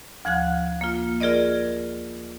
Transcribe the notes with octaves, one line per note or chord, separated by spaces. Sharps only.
D2 F3 F#5 F#6
A#3 F4
F4 G#4 A#4 D5 D#5